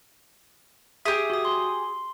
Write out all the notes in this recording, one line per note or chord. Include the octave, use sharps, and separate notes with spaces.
G4 G#4 E5 D#6
F#4 D#6
C6